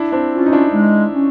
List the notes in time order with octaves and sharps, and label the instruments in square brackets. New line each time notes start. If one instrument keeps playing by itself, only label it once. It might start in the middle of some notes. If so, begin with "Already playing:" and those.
Already playing: [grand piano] D4 E4
C4 D4
[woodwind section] C#4 F4
[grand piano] D#4
D4 E4
[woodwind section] G#3
C#4